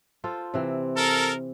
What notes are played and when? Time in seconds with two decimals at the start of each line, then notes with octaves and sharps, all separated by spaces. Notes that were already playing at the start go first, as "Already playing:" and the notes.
0.24 F4 A4 C5
0.54 C3 E3 C4
0.96 A4 A#4